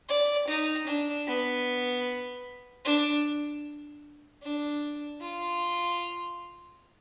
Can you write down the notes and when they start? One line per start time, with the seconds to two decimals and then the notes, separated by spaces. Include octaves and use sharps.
0.09 D5
0.48 D#4
0.88 D4
1.28 B3
2.85 D4
4.43 D4
5.22 F4